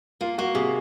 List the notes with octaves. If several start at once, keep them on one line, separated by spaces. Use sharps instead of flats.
A#3 F4
A#3 F#4
C3 G#4